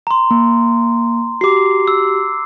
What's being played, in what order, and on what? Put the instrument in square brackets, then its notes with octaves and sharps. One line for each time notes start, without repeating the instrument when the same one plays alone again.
[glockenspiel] A#5 C6
[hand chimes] A#3
[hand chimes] F#4 G4 [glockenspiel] D6 C7
[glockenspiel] E6